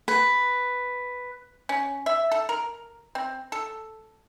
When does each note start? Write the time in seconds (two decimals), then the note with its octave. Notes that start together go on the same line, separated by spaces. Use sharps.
0.08 B4
1.69 C#4
2.06 E5
2.32 A4
2.49 A#4
3.15 C4
3.52 A4